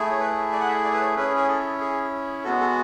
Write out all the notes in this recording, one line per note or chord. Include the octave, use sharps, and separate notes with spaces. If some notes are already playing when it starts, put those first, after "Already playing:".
Already playing: A3 E4 G#4
C#5
B4
D5
F#5
E5
D5
B4
C#5
C#4 E4 G#4 B4
G#4
A4
G#4
G#3 B3 F#4 A4
A4